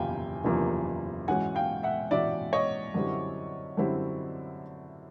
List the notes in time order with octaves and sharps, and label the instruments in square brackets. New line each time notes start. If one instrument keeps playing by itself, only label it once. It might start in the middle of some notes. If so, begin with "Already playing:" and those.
Already playing: [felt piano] F#1 E2 C3 F3 A#3 [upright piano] F5 G5 G#5
[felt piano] F#1 E2 C3 F3 A#3
[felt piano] G#2 E3 G#3 C#4 F#4 [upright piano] F#5 G#5
[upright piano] F5 G5
E5 F#5
[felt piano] G#2 E3 G#3 C#4 F#4 [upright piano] D5 E5
[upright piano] C#5 D#5
[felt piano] F#2 D3 G3 C4 E4
F#2 D3 G3 C4 E4